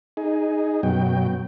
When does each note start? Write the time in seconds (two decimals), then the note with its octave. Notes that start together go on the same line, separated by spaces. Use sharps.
0.17 D#4 G#4
0.83 F#2 B2 F#3 G5